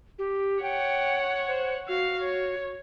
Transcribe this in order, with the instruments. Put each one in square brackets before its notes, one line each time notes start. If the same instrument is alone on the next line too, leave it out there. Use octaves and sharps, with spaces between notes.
[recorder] G4
[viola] C#5 F#5 [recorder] G5
[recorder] C5
[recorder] F#4 [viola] F5
[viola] C#5